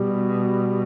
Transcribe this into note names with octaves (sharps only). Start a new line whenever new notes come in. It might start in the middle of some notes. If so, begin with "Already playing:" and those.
Already playing: B2 G3